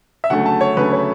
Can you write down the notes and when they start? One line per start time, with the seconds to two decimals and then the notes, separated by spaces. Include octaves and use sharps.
0.24 E5
0.30 D2 C#3 F#3 A3 F#5
0.46 A5
0.61 C#5
0.77 D2 C#3 F#3 A3 B4
0.92 C#5